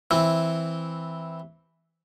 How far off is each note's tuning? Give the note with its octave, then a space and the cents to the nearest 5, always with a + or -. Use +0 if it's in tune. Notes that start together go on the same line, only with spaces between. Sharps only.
E3 +0 C4 +0 E4 +0